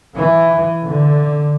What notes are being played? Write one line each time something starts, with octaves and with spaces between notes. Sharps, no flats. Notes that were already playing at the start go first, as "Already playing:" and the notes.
E3
D3